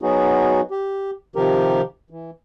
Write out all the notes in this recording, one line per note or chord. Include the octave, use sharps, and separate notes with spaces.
F#3 B3 D#4 F#4 G#4
G4
C3 D#3 F3 G4 A#4
E3